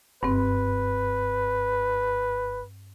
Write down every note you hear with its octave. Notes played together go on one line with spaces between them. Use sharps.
F#1 G2 C4 B4